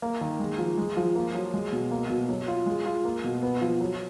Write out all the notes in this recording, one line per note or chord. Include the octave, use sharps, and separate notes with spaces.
A#3
D#3
G#3
F3
G#3
F3
A#3
F#3
G#3
B2
A#3
B2
F#3
F4
G#3
F4
A#3
B2
B3
F3
F#3